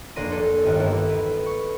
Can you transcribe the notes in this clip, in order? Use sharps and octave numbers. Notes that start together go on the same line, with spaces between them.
F1 A#3 D4 C6 A#6 D#7
A4
G1 D#2
A#3 B3 E4 F#4 A4
B4
C#6